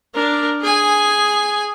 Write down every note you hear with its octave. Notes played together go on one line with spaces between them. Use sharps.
D4 A#4
G#4 G#5